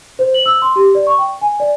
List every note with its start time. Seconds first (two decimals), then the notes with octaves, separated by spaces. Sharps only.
0.19 C5
0.34 F#7
0.46 E6
0.62 C6
0.76 G4
0.95 D5
1.07 C#6
1.19 G5
1.41 G#5
1.60 D5